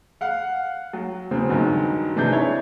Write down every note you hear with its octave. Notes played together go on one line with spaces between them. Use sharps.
F5 F#5
F#3
E2 C#3 C4
G2 D#3 F#3 G#3
C3 E3 D4 D#4 G#4 G6
E4 C#5